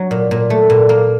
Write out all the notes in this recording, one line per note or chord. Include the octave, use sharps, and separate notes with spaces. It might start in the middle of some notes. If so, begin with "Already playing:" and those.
Already playing: F#3
A#2
A#2
A3
A#2
A#3